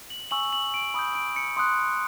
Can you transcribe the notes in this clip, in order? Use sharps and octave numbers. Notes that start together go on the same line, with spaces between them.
F#7
G#5 C#6 E6 F#7
F#7
D7
B5 D#6 G6
D7
C#7
C6 D#6 F#6